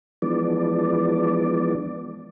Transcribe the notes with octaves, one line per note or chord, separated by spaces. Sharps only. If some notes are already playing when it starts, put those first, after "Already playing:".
E3 F3 G#3 B3 D4 D5